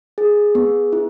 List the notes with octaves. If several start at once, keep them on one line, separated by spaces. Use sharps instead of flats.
G#4
B3
E4